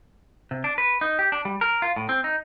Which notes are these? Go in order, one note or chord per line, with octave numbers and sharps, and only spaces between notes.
C3
D4
B4
D#4
G4
D4
G3
A#4
F4
A2
C4
D#4